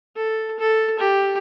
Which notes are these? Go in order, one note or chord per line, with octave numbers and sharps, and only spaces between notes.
A4
A4
G4